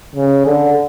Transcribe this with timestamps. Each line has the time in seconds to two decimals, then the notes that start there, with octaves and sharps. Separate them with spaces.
0.16 C#3
0.46 D3